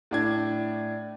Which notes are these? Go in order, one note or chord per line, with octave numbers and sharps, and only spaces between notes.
A2 D4 G#6